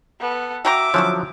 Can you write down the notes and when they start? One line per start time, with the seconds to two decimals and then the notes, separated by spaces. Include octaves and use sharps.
0.20 B3 A4
0.65 F#4 E5 G5 A#5 D6
0.94 D3 F3 F#3 C#4 E4 F#4